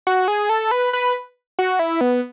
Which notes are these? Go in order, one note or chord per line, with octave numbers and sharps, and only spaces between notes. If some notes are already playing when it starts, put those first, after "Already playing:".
F#4
G#4
A4
B4
B4
F#4
E4
B3